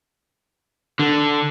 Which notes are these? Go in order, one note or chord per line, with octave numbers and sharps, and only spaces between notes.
D3